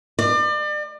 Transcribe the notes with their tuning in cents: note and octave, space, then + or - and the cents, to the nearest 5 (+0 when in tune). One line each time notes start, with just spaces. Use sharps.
D5 +35